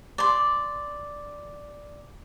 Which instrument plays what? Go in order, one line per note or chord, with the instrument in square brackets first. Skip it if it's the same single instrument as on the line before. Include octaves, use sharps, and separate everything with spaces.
[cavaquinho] D5 C6